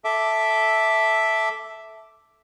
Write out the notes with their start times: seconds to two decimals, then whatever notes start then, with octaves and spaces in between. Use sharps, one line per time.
0.05 A4 E5 D6